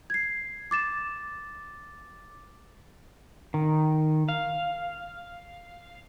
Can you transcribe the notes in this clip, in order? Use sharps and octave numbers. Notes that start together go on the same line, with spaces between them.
G#6 C7
D6 A6 E7
D#3
F5